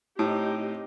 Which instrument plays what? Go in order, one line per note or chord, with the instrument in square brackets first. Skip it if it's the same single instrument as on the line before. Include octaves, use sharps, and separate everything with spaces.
[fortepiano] A2 [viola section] C4 D#4 G4